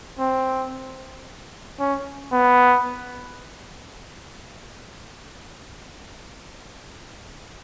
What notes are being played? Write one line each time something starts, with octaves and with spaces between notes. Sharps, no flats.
C4
C#4
B3